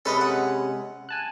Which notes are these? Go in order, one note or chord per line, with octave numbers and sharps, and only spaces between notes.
C3 G#3 C#4 A4 B4 D#5
F#5
G#5 A5 F#6